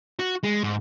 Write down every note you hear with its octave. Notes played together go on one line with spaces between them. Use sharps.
F#4
G#3
G#2